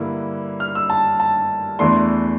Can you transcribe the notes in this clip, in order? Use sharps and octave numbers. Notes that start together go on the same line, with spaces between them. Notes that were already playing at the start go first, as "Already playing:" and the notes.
Already playing: G2 D3 G3 A#3 E4
F6
E6
A5
A5
E2 E3 A3 D4 C6